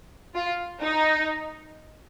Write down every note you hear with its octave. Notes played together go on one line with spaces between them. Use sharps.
F4
D#4